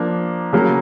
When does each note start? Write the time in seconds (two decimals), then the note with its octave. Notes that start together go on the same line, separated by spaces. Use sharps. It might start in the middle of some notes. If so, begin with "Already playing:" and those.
Already playing: F3 A#3 D4
0.53 C#3 F#3 A#3